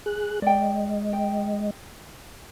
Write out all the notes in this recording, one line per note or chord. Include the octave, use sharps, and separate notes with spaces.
G#4 F#6
G#3 D5 D#5 G5
G5